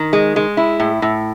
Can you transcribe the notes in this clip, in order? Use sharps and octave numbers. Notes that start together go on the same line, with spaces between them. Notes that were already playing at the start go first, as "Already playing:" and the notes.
Already playing: D#3
G#3
G#3
E4
A2
A2